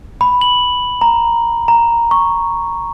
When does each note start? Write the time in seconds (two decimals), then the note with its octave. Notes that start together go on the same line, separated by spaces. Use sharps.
0.21 B5
0.41 F#7
1.01 A#5
1.68 A#5
2.11 C#6